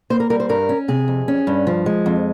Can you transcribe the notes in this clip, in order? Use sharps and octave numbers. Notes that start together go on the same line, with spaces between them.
A#3 C5
A#4
G3 A#4
C5
G2 A#4
C#4
C3 G#4
F2
C#4
G2
F3
G#3
F2